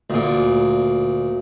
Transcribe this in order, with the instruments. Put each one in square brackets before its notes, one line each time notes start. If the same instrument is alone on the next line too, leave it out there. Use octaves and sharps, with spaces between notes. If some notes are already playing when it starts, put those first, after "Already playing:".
[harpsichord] D2 A#2